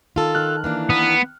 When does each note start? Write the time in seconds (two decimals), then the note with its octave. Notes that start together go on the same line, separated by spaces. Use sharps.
0.16 D#3 F4 A4
0.35 D#3 F6 F#6
0.64 E3 A#3 D4
0.90 B3